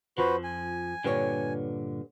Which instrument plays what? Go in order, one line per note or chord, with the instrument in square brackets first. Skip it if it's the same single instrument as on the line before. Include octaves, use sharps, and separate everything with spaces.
[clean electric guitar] F2 F3 [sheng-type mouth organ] F#4 B4 C5
[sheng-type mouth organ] G#5
[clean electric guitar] G2 A#2 D3 [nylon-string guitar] G4 B4 C#5